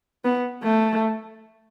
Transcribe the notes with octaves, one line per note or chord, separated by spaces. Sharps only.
B3
A3